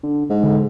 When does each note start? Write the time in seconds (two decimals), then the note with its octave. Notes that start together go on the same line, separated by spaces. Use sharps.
0.03 D3
0.30 G#2
0.43 D3